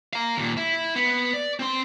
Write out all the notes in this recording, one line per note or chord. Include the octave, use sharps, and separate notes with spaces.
F5 A#5
D#2 A#2
E4
B3
D5
C4 C6